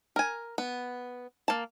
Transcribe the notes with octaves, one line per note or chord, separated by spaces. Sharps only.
A#4 G#5
B3
A#3 A5